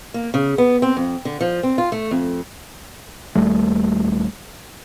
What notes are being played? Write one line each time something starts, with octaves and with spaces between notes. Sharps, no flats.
A#3
C#3
B3
C4
F2
D3
F3
C4
F4
A3
F2
D#1 D#2 G3 A3